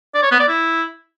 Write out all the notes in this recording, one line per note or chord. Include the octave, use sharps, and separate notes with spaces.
D5
C#5
B3
D5
E4